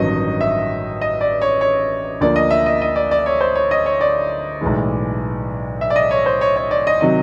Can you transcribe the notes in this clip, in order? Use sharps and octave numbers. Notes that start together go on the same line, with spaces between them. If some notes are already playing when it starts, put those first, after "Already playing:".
Already playing: A1 G2 D#3 F#3 D#5
E5
D#5
D5
C#5
C#5
D2 D3 F3 A#3 D5
D#5
E5
D#5
D#5
D5
D5
C#5
C5
C#5
D#5
C#5
D5
B1 A2 E3 G#3
E5
D5
D#5
C#5
C5
C#5
C#5
D5
D#5
C3 D#3 F#3 D#5